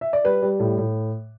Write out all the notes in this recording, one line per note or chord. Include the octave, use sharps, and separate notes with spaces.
E5
D5
G3 B4
G3
A2
A2